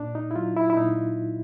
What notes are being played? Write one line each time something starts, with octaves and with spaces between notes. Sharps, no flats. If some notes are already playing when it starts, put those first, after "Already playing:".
Already playing: A#2 D4
D#4
E4
F#3 F4
E4
E4
A#2 D#4